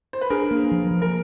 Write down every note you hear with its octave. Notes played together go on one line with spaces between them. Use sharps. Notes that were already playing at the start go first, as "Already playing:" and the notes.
C5
B4
D4 G#4 A#4
A#3
F3
F3
A#4